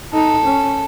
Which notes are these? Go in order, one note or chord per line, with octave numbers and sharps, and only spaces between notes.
D#4 A4
C#4